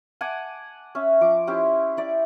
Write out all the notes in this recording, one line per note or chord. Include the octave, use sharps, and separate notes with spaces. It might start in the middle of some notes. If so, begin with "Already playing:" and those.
F#5 G#5 A5 D6
C#4 E5
F3 D6
C#4 E4 G4 C5
E4 D5